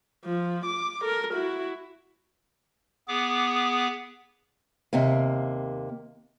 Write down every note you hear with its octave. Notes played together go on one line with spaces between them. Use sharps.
F3
D6
A4 A#4
E4 F#4
B3 G#4 D6
D#2 C3 A#3